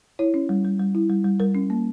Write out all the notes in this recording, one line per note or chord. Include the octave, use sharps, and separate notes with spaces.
E4 C#5
C#4
G3
G3
G3
E4
G3
G3
G3 A#4
C#4
A#3